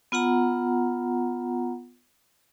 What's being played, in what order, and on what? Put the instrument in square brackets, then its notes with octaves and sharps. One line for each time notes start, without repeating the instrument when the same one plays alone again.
[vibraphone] B3 F4 F#5 A#5